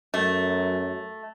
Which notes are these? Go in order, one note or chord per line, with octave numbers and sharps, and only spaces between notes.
F#2 A3